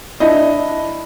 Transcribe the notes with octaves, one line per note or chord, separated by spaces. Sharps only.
D4 E4 D#5